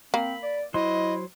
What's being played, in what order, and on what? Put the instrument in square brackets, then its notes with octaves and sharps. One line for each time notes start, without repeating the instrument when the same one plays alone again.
[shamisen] A#3 [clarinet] C4 [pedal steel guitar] B5
[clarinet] D5
[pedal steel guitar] F#3 C5 C6 [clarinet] E4 [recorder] D#5